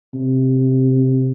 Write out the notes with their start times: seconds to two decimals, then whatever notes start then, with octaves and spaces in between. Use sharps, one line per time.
0.14 C3